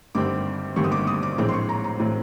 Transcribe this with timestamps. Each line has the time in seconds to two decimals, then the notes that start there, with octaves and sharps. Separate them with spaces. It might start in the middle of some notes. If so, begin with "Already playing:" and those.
0.15 G#1 G2 D3 G3 C4 D6
0.76 G#1 G2 D3 G3 C4 C#6
0.84 D#6
0.92 D6
1.07 D#6
1.23 D6
1.38 A#1 A2 E3 G#3 C4 D6
1.48 C6
1.53 C#6
1.69 A#5
1.84 A#5
2.00 A2 E3 G#3 C4